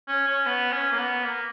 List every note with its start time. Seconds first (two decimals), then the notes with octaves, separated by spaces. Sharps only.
0.08 C#4
0.27 C#4
0.46 B3
0.72 C#4
0.92 A#3
0.99 B3
1.24 A#3